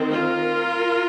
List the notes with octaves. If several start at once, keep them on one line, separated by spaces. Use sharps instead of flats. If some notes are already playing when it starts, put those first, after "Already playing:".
Already playing: D#3 C4
F4 A#4